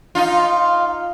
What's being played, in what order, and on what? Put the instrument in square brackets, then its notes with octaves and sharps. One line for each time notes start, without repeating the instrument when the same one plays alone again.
[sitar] D#4 F4